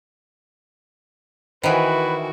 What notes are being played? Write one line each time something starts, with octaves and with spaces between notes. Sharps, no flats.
D#3 E3 E4 F#4 B4 C5 F#5 G#5